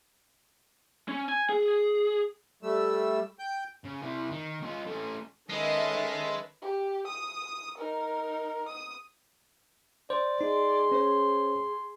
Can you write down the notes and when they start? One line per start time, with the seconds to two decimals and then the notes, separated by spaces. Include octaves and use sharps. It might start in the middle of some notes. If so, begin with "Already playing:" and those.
1.09 C#4
1.29 G#5
1.49 G#4
2.63 G3 A3 E6
3.39 G5 G6
3.84 C#3
4.02 C3 E4
4.31 D#3
4.62 C#4 F4
4.86 A3 C#4
5.50 D#3 G#3 C#4 A4 B4 D#5 E5
6.62 G4
7.07 D#6
7.78 D#4 A#4
8.69 D#6
10.10 C5 D5
10.41 D#4 G#4 C6
10.92 C#4 C5 C#5